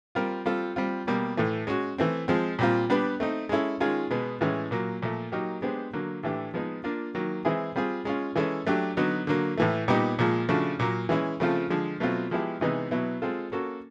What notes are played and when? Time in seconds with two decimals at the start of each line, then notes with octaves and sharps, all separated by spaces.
0.15 G3 C4 F4 A#4
0.46 G3 C4 F4 A4
0.76 G3 C4 F4
1.07 B2 G3 A#3
1.37 A2 E3 A3
1.67 G#3 C#4 F#4
1.98 E3 A3 C4
2.28 F3 G#3 C4
2.59 A#2 G3 C4 F4
2.90 G3 B3 D4 G4 B4
3.20 A3 C4 D#4
3.49 G#3 C#4 E4 A4
3.80 D#3 G#3 C#4 F4 G#4
4.11 B2 G#3 B3
4.41 A2 E3 G#3 C#4
4.71 A#2 F#3 A#3
5.02 A#2 F3 A3
5.32 F#3 A#3 D#4 G4 A#4
5.62 G#3 B3 D4 G4 C5
5.93 D3 F#3 A#3
6.23 A2 E3 A3 D4 G4
6.54 F3 G#3 B3 D#4
6.84 A#3 D4 F4
7.15 D#3 F#3 A#3
7.45 E3 G#3 C4 E4 G#4
7.76 G3 C4 F4 G#4
8.05 G#3 C#4 F4
8.36 E3 G#3 C#4 E4 A4
8.67 F#3 A3 D4 G4
8.97 D3 F#3 B3 D#4 F#4
9.27 D3 F#3 A#3
9.57 A2 E3 A3
9.88 A#2 G3 B3 D#4 G4
10.19 A#2 F3 G#3
10.49 C#3 F3 A3 D4 F#4
10.79 A#2 F#3 A#3
11.09 E3 G#3 C#4 E4
11.40 C#3 F3 A3 C4 F4
11.70 D3 F3 G#3
12.00 B2 F#3 A3 C4 F4
12.31 F3 G#3 B3 E4 G4
12.61 C3 E3 G#3 B3 D#4
12.91 B2 F#3 B3 E4
13.22 G#3 C4 F4 A4
13.52 A#3 C#4 F#4 A4